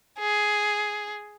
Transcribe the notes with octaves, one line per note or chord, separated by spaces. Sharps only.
G#4